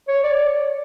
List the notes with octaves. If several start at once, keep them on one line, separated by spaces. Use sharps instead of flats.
C#5
D5